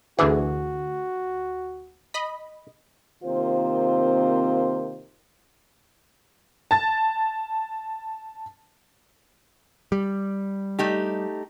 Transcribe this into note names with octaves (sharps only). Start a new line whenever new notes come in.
D2 D3 E3 F#4 G#4
D#5 B5
C3 D#3 A#3 C4 F4 C5
A5 A6
G3
A3 D#4 G4